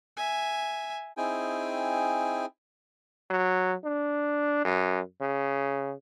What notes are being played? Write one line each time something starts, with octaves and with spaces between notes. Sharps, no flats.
E5 G#5
C4 D#4 E4 G#4 G5 G#5
F#3
D4
F#2
C#3